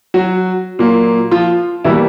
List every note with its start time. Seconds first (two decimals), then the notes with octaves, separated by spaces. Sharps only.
0.14 F#3 F#4
0.79 A#2 F#3 A#3
1.31 F3 F4
1.84 B2 E3 G3 A#3 E4